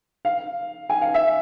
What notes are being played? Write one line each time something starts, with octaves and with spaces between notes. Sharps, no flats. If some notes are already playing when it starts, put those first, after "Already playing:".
F5
G#5
F5
E5